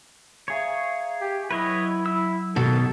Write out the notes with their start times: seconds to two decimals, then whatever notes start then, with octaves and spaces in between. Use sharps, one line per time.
0.48 G#4 C#5 E5 F5 A#5
1.21 G4
1.51 F#3 E4 B4 C#5 D#5
2.06 E4 E6
2.56 B2 D#3 A4 A5